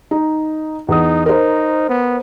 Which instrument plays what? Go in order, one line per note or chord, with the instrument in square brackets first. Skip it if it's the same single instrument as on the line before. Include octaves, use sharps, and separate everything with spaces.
[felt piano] D#4
[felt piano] E2 D#6 [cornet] D#4
[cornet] D#4 [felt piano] A#4 C5
[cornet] B3